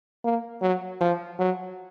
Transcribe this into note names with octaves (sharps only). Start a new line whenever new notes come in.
A#3
F#3
F3
F#3